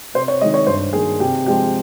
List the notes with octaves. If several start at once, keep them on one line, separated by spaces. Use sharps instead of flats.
C3 C5
C#5
D#3 G#3 D#5
C#5
G2 C5
D#3 A#3 G#4
C3 G4
F3 G#3 G4